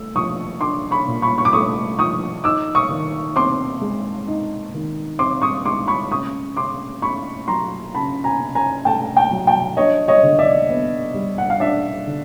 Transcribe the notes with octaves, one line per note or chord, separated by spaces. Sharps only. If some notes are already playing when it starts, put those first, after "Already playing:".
Already playing: A3 E6
F3 C#6 D#6
D4 C6 D6
B5 C#6
A#2
B5 C#6
C#6
D6
A3 C#6 D#6
F3 C#6 D#6
D#4 D6 E6
C#6 D#6
D#3
C4 C6 D6
G#3
D#4
D#3
C4 C6 D6
C#6 D#6
G#3 C6 D6
B5 C#6
C#3 C#6 D#6
C#3 C6 D6
A3 B5 C#6
F#3 A#5 C6
C#3 A5 B5
G#5 A#5
C#3
G#5 A#5
A3 G5 A5
G5 A5
F#3
G5 A5
D4 C#5 D#5
C#5 D#5
D3
D5 E5
B3
G3
F#5
F5
D4 D5 E5
D3